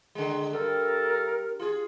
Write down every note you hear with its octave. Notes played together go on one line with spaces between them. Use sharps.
D3 G#3
G2 A4 A#4
F4 G#4